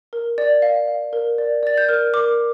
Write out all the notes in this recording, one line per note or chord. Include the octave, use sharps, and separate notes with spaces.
A#4
D5
F5
F5
A#4
D5
D5 A6
G6
A#4 F6
A#4 D6